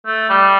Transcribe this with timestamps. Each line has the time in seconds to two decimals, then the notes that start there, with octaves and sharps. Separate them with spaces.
0.06 A3
0.30 G3